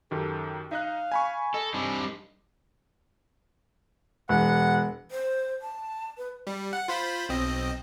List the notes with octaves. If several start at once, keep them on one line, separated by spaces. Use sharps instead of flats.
F#2 D#3 G4 A4
D#4 D#5 F5 F#6
G#5 B5 C#6
A4 D#5
G3 C4 D4 D#4
E1 F#5
C5
A5
B4
G3
F#5
F4 C5 B5
B1 C4 D#5